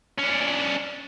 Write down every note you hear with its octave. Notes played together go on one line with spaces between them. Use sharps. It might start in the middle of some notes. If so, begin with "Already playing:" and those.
C#4 D4